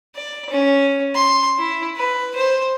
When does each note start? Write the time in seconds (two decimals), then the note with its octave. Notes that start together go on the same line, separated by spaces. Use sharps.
0.15 D5
0.50 C#4
1.14 C6
1.58 E4
1.96 B4
2.35 C5